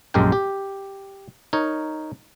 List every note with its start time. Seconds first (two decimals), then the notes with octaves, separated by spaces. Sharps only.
0.14 A#1 F#2 G#3 G4 A#4 G5
0.32 G4
1.53 D#4 A#4 C#5